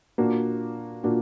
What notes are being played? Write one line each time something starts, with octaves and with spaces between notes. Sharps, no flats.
A#2 A#3 D4 F#4
A#2 A#3 D4 F#4